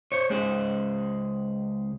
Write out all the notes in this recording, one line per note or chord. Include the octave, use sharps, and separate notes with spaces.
C5 C#5
C#2 G#3 G#4 C5